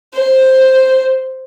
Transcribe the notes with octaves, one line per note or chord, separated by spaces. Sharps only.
C5